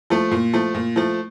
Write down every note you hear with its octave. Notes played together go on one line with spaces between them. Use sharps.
F3 A3
A#2
F3 A3
A#2
F3 A3